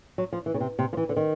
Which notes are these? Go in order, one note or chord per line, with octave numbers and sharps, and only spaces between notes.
F#3
F3
E3
C#3
C3
C3
F3
E3
D3
D#3